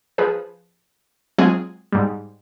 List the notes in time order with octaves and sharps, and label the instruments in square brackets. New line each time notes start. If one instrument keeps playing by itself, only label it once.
[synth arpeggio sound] F3 G#4 B4
F#3 G#3 C4 F4 G#4
G#2 G3